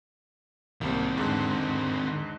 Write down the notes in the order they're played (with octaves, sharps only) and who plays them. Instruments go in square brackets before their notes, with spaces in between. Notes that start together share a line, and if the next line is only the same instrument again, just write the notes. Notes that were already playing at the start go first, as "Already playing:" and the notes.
[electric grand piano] C2 G3 A#3 [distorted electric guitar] D#3 C4
[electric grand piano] E2 G#2 D3